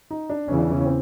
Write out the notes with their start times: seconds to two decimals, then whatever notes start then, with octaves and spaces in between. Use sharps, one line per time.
0.11 D#4
0.30 D4
0.48 E2 C#3 E3 C#4
0.58 D4
0.67 C#4
0.81 C#4
0.86 C4